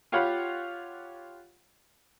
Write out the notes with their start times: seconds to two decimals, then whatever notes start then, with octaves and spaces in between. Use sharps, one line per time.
0.12 F4 G4 C#5 F5 F#5 B5